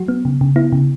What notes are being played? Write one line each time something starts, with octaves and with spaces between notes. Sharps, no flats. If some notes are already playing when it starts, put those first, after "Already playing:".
Already playing: F#3 F#4
B3
C#3
C#3
B3 E4
C#3